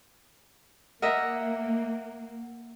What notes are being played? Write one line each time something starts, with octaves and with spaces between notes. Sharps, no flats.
A#3 A#4 D#5 E5 F#5